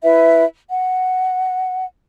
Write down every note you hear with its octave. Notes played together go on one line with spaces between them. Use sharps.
E4 B4 E5
F#5